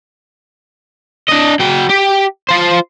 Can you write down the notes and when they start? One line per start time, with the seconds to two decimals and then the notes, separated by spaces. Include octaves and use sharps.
1.28 D4 D#5
1.60 F#3 G5
1.89 G4
2.49 F4 C5